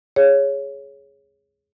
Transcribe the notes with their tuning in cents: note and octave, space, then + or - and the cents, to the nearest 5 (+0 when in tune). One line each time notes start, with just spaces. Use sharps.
G#4 +0 C#5 +0